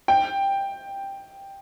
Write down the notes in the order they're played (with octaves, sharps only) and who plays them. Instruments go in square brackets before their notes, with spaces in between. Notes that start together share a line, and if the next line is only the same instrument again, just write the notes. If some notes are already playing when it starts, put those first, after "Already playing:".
[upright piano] G5